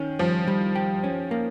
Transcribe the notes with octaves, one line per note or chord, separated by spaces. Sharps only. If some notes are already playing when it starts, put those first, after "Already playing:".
Already playing: D#3 C#4
F3 G3
G3
G4
C#4
A#3